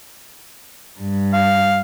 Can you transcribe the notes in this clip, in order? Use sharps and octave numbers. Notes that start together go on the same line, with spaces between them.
G2
F5